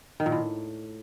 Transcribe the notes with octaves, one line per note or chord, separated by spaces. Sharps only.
D#3
A#2
A2